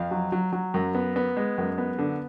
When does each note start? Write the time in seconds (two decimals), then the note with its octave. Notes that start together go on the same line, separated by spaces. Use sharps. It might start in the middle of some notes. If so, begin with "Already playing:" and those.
Already playing: F2 F5
0.11 F#3
0.32 F#3
0.53 F#3
0.74 F#2
0.95 B3
1.16 B3
1.37 G#3
1.58 F#2
1.78 B3
1.99 D3